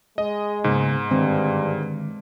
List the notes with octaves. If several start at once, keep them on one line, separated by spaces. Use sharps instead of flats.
G#3 D#5
G#2 C#3 A#3 B3 D#4
G2 D3 D#3 G#3 C4